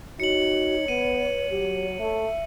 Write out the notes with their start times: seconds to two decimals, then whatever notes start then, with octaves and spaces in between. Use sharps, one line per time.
0.20 D#4 F#4 C#5 C#7 F#7
0.88 B3 B4 D#7
1.50 F#3 G4
1.99 A3 E5